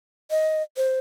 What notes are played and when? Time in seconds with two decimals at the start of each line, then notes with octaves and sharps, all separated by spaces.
0.31 D#5
0.77 C5